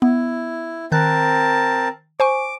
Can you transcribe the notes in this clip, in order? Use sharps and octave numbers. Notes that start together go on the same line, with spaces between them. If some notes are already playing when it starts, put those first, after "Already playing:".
B3 E4
D#3 C4 A#4 A5 F#6
C5 G#5 C#6 D6